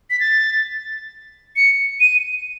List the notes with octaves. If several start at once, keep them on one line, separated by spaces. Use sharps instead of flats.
B6
A6
C#7
D#7